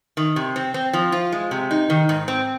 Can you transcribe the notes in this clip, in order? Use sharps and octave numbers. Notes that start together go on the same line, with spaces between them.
D#3
C3
C4
C4
F3
F4
G#3
C3
D#4
D#3
G#2
C4